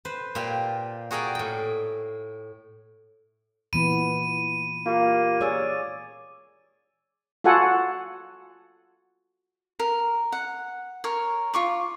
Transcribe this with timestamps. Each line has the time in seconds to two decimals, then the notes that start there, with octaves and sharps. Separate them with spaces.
0.05 B4 C5
0.35 A#2 F4 G4
1.11 F#4 G#4 A#4 D5 G5
1.35 A2 G5
3.73 A#2 E3 B3 B5 D#7
4.86 A#3 F4 G4
5.41 G#4 C#5 D5 D6 E6 A6
7.44 F4 F#4 A4 F#5 G#5
9.79 A#4
10.32 F#5
11.04 A#4 C#5
11.54 F4 C#6 D6